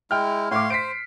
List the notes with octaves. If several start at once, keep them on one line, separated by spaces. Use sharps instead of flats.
G#3 E4 G5 F6
A2 C#5 F5 C6 D6
C5 B6 C7 D7